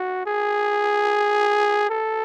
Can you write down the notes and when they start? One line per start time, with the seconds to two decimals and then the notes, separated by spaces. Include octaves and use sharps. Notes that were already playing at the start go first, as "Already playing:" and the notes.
Already playing: F#4
0.26 G#4
1.90 A4